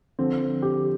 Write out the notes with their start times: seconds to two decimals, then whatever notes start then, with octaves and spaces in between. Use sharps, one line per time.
0.19 D3 F3 C4
0.62 G4